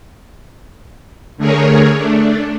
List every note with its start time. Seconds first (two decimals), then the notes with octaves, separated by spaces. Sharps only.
1.37 D3 A3 G#4 A#4 C#5
1.96 A3 D4